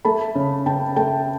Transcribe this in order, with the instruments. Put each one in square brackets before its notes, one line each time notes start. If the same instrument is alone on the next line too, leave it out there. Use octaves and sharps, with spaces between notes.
[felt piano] A3 A5 B5
C#3
C#3 G5 A5
A3 G5 A5